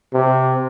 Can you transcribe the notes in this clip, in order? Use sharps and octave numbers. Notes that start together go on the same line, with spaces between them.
C3